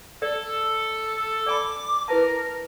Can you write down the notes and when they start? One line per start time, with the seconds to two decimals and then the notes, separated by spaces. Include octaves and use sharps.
0.22 A4 D5
1.46 D5 G#5 B5 D6
2.08 E4 A#4 B4 A5